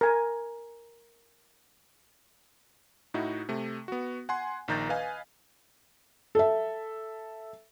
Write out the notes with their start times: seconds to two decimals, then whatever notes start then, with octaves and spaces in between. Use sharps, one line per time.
0.01 A#4 G#5
3.14 A2 D#4 E4 F#4
3.49 C3 A3
3.88 B3 F#4
4.29 F#5 G#5 C6
4.68 A#1 D#3 A#5 G6 A6
4.89 B4 D#5 F5 G#5
6.35 A4 E5